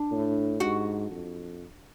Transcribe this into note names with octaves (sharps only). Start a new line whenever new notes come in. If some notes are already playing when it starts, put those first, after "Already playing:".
Already playing: D4
A2
G#2 F#4
F2